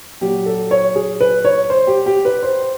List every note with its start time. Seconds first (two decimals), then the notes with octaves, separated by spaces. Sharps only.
0.21 A#2 F#3 G4
0.46 A4
0.71 C#5
0.96 G#4
1.20 B4
1.45 C#5
1.70 C5
1.87 G4
2.06 G4
2.25 B4
2.43 C5